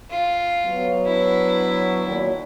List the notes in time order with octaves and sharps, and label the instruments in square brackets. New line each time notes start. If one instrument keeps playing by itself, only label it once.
[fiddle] F4
[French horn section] F#3 B3
[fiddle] D4 E4
[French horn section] A#2 D#3 F#3